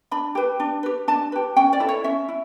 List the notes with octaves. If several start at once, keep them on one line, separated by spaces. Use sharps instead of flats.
D4 B5
G4 B4
D4
G4 B4
D4 A5
G4 B4
C#4 G5
D5
E4 A4
C#5
C#4 E5
E4